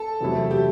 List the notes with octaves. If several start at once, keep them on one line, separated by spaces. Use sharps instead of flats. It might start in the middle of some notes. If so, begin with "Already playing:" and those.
Already playing: A4
E2 C3 F#3 A3 E4
G4